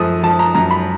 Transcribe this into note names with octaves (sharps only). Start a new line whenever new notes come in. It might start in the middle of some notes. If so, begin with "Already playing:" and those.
Already playing: F#2 F3 A3 D#6 E6
F3 A5
A#5
F#2 A#5
B5